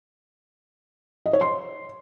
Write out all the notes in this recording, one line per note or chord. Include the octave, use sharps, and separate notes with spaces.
D#5
C#5
C6